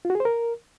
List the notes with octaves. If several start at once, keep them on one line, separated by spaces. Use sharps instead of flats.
F4
F#4
G#4
C5
A#4